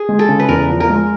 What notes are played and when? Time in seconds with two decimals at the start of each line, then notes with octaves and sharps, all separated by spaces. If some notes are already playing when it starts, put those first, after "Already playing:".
Already playing: G#4
0.09 G#3
0.19 A4
0.29 C#3
0.39 B4
0.49 E2 A#4
0.70 F3
0.80 A#4
0.89 G#3